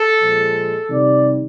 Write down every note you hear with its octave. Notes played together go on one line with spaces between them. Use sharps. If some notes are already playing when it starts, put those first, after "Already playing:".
Already playing: A4
A#2 F3 G#3
C3 D#3 G3 D5